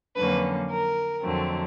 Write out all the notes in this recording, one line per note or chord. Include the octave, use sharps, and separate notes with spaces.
F2 D3 F#3 A#3 C#4 B4
A#4
F2 D3 F#3 A3 C4